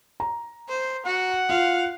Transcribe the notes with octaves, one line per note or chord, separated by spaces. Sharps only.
A#5
C5
F#4 F#5
F4 F5